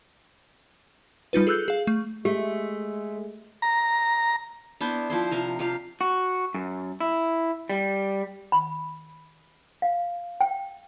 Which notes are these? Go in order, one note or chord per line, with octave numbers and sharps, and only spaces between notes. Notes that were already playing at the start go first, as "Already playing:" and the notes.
G3 D#4 F4 B4
G#4 A4 E6 F#6 G6
G#4 F5
A3
G#3 A3 G4
A#5
B3 D4 E4 C5
F3 E4 C5
C3 F3 A#4
F3 G4 F5
F#4
F#2
E4
G3
B5
F5
G5